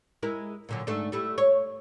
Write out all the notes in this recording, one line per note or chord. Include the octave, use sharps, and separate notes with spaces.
G#3 E4 A#4
A#2 D3 F#3
G#2 A3 D4
G3 A3 E4
C#5